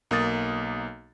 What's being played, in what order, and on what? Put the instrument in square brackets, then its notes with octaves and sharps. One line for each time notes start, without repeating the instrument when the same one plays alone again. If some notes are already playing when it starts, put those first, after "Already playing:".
[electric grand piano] B1 A#3 D#6 A6